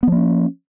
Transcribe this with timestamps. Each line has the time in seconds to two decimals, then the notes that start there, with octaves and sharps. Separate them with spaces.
0.03 B3
0.07 F3
0.12 A#3
0.17 C#4